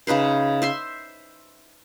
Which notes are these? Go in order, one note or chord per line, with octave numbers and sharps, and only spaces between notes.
C#3 D#4 B4 C5
C5 E5 C6